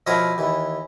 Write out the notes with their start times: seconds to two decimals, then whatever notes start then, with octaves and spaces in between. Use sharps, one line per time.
0.07 B2 F3 E4 A#4 C#5 D#6
0.38 D#2 E3